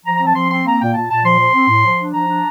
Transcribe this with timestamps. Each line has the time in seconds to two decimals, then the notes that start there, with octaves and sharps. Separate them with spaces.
0.06 F3 A#5
0.16 A#5
0.20 C4
0.26 A5
0.35 F3 C6
0.51 C4 C6
0.65 A#3 A#5
0.81 A#2 G5
0.94 A#2 A5
1.10 A#2 A5
1.24 F3 C6
1.39 F3
1.55 C4
1.69 A2
1.84 F3
2.00 D4
2.14 F3 A#5
2.28 D4